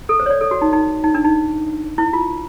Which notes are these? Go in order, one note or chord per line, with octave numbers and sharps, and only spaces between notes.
A4
C5
C#5
D5
A4
F#4
D#4
D#4
D#4
D4
D#4
E4
F4